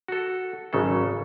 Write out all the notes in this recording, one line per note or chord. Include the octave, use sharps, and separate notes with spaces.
F#4 A4
G#1 C#3 F#3 A4